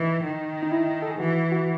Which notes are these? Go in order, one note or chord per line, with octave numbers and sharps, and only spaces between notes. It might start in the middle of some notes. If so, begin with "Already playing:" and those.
Already playing: E3 D#4
D#3
D#4
E4
A4
G#4
E3 F#4
F#4